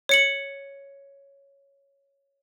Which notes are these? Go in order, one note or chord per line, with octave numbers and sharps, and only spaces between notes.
C#5 C#7 F#7